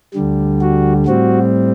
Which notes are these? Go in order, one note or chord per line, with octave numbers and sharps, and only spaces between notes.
D2 D3 G3
F#4
A2 G3 C4 F#4